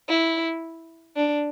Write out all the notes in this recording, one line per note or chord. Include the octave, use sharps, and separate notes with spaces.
E4
D4